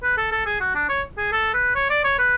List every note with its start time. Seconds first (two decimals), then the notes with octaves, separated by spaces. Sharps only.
0.03 B4
0.17 A4
0.32 A4
0.46 G#4
0.60 F#4
0.75 D4
0.89 C#5
1.18 G#4
1.32 A4
1.54 B4
1.75 C#5
1.90 D5
2.04 C#5
2.19 B4